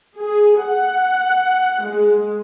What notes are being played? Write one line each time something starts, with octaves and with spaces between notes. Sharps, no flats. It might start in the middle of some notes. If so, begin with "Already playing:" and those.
G#4
F#5
G#3